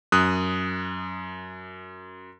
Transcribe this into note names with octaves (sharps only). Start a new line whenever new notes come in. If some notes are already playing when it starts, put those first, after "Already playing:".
F#2 D#6 F#6